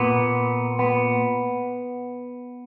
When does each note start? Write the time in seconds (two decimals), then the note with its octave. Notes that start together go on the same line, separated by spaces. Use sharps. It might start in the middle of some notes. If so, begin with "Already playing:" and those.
Already playing: A#2 B3
0.79 B3